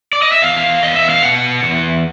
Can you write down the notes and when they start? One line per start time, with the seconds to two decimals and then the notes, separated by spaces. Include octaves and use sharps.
0.13 D5
0.22 D#5
0.32 E5
0.42 E2 F5
0.82 E2 D#5
0.95 E5
1.10 F5
1.23 B2 F#5
1.63 E2